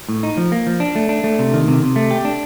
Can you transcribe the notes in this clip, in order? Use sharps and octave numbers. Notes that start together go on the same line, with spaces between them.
A2
D#4
F3
A#3
F3
D4
A3
D4
A3
C3
D#3
C3
C3
A3
G4
D4